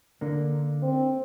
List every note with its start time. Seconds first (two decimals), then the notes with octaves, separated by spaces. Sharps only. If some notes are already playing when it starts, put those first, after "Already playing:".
0.21 D3 A#3
0.82 C4